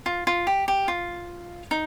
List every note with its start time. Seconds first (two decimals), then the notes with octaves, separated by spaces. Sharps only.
0.06 F4
0.27 F4
0.47 G4
0.68 G4
0.88 F4
1.71 D#4